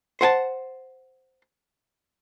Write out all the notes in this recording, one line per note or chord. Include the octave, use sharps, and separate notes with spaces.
C5 F#5 G#5 A5